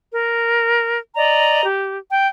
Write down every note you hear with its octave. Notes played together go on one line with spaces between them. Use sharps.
A#4
D5 D#5 A#5
G4
G5